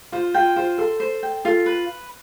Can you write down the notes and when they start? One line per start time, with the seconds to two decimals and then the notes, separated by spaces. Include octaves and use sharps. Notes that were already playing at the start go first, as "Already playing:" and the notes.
0.12 F4 C5
0.34 F4 G5
0.56 F4 C5
0.78 A4 C6
1.00 C5
1.23 G5
1.45 F4 A4
1.66 B4